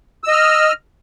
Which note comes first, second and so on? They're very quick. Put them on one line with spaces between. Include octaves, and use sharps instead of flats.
E6 D#5 F6